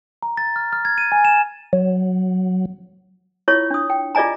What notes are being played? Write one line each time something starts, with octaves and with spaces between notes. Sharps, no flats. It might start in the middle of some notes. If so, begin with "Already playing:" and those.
A#5
A6
F6
F6
G#6
D#7
G#5
E7
F#3
E4 F4 C#5 C#6
D4 D#6
G5
F4 G#4 D5 D#5 G#5 A#5